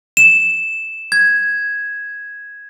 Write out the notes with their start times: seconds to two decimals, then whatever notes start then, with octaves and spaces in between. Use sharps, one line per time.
0.17 E7
1.12 G#6